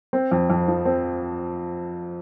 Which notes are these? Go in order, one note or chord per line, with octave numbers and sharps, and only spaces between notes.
C4
F2
F2
F3
C4